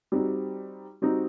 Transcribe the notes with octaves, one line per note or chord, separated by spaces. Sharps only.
G3 C4 D#4 F#4
G3 C4 D#4 F#4